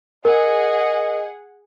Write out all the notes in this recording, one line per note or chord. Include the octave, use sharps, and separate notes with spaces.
G#4 A#4 D#5 F#5